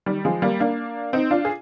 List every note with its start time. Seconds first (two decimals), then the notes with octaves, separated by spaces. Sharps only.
0.06 D#3 G3
0.25 F3 G#3
0.42 G3 A#3
0.60 A#3 D4
1.13 C4 D#4
1.31 D4 F4
1.45 G#4